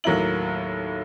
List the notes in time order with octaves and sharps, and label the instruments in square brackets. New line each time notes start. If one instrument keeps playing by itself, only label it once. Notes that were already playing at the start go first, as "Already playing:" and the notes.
[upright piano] D#2 A2 F#3 A#3 E4 F#7